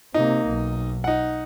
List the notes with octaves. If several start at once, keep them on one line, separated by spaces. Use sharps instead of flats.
C3 A#3 D#4
B1
D#4 F#5